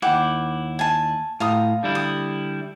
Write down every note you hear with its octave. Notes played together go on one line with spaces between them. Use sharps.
D#2 E4 F#5 G5 D6
G#5 A5
A2 F4 A#5 D#6
D3 G3 E4
D#6